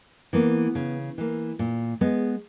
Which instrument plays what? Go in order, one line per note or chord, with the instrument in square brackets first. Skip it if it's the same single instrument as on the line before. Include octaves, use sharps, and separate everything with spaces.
[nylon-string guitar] E3 A#3 B3
C#3
E3 A#3
A#2
G#3 B3